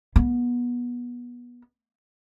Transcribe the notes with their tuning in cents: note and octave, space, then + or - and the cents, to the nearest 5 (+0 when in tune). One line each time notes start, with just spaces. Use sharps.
B3 -25